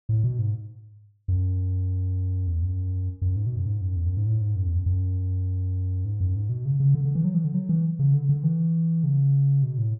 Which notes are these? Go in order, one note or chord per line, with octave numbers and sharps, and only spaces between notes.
A2
B2
G#2
F#2
E2
F#2
F#2
G#2
B2
F#2
G#2
F#2
E2
F#2
G#2
A2
G#2
F#2
E2
F#2
F#2
G#2
F#2
G#2
B2
C#3
C#3
D3
D3
E3
F#3
E3
D3
F#3
E3
C#3
D3
D3
E3
C#3
B2
A2